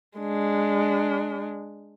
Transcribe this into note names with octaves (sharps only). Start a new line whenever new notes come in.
G#3 D4